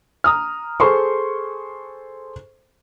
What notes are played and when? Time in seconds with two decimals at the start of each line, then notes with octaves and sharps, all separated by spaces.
0.24 A#5 D#6 F6
0.80 G#4 A4 C5 C6 C#6